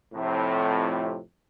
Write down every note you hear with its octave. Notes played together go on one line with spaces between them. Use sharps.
F2 A2 C3